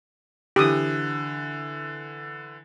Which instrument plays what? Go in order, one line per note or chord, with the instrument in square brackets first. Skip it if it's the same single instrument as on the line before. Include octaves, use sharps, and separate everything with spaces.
[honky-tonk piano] D3 E3 [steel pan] G4 D#6